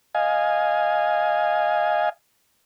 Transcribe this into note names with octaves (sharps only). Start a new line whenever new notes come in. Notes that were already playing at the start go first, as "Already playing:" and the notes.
D#5 F5 G#5